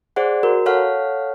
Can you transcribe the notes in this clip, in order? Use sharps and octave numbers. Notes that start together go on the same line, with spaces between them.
G#4 C5 D5 F#5
F#4 A#4
A4 C#5 F5 F#5 F6